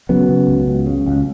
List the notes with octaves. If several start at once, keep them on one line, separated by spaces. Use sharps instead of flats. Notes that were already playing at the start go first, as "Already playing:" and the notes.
C#3 F#3 B3
C#3
C#2
C#2
C#3
C#2